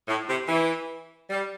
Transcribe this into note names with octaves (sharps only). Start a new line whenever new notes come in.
A2
C3
E3
G3